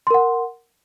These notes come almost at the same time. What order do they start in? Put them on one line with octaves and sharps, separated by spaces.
C6 A#4 F#5